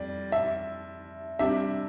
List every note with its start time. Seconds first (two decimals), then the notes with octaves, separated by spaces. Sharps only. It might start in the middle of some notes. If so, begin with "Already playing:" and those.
Already playing: F2 G3 D5
0.32 E5
1.39 C3 G3 D4 G4 E5